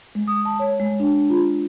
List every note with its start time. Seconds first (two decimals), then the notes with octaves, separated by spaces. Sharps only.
0.15 G#3
0.28 D#6
0.45 A5
0.59 C#5
0.80 G#3
1.00 D4
1.30 F4